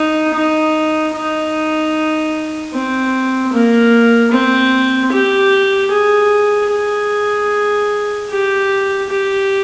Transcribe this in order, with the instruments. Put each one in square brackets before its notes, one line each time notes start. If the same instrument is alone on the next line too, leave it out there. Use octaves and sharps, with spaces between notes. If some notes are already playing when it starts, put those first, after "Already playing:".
Already playing: [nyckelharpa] D#4
D#4
D#4
C4
A#3
C4
G4
G#4
G#4
G4
G4